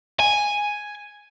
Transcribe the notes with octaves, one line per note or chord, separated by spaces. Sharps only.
G#5